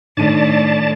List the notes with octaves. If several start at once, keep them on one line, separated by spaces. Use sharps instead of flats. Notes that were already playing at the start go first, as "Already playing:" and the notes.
A2 D#3 D4 D5 A5 D#7